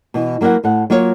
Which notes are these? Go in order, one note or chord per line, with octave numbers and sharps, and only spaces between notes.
B2 E3
F#3 A#3 E4 F#4 F#5
A2 F#5
F#3 A#3 F4 C#5